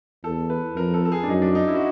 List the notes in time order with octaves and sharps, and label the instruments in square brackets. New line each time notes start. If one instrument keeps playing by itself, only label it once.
[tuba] E2 [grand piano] A4
[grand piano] B4
[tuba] F2 [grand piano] A#4
[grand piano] A4
A4
G#4
D4
[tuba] F#2 [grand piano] D#4
[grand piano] D4
D#4
E4
F#4